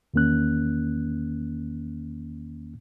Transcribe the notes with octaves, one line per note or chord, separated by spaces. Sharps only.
E2 D#3 A#3 C#4 F#6